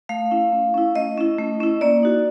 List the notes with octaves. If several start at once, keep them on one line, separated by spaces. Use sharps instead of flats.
A3 F5
C#4 E4
A3
C#4 E4
A3 D#5
C#4 E4
A3
C#4 E4
A#3 D5
D#4 F#4